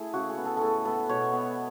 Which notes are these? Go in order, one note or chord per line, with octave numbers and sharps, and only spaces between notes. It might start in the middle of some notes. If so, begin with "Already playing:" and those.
Already playing: A3 E4 G#4
C#3 F#4
G#4
B3
A4
A2 G#4 A4
B3 A4
B2 C#5
B3